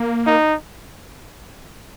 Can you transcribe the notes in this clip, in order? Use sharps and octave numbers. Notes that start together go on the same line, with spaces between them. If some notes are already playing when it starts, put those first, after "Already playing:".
Already playing: A#3
D#4